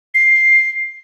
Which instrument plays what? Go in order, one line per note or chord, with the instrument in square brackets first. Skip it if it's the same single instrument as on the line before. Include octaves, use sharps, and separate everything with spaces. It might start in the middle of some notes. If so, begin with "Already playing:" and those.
[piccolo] C7